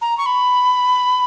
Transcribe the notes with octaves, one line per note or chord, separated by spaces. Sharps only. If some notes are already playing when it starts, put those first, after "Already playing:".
A#5
C#6
B5